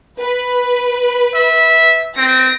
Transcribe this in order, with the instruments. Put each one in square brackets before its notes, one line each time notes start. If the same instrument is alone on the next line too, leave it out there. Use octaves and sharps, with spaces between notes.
[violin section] B4
[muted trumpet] E5
[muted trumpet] C4 [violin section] A#6 D7